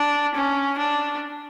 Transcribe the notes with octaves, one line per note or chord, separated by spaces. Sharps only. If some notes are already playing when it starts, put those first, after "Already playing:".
Already playing: D4
C#4
D4